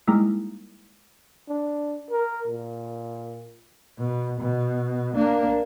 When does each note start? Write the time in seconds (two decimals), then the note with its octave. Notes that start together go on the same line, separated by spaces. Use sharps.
0.07 G3 G#3 A#3 D#4 E4
1.49 D4
2.11 A#4
2.48 A#2
3.98 B2
4.40 B2
5.15 A#3 D4